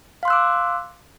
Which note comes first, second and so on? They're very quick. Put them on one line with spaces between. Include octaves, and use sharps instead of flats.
F5 C6 F#6 E6 D6